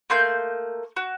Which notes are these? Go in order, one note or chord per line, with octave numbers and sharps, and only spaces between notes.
A3 A#3 C6 G6
F#4